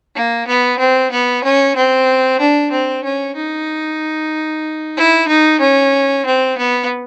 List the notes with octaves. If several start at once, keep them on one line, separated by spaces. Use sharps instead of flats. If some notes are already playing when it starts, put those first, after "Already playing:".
A#3
B3
C4
B3
C#4
C4
D4
C4
C#4
D#4
E4
D#4
C#4
C4
B3